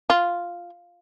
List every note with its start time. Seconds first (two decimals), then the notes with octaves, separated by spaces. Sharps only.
0.10 F4